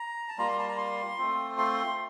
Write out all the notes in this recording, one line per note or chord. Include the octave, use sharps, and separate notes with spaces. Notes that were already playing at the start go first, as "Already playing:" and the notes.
Already playing: A#5
A5
G3 A#3 F4 A#5
C6
A5
A#5
C6
A3 C4 F4
C6